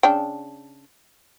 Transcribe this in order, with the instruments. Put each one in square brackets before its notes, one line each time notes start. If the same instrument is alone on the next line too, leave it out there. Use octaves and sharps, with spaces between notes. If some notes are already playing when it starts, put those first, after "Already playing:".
[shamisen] C#3 D4 G5